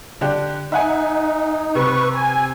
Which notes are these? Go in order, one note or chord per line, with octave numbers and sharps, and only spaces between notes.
D3 D4 G4
D#4 E5 F#5 G#5
C3 B4 C#6
G#5